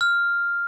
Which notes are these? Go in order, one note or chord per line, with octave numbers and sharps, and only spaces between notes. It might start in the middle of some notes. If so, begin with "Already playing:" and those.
F6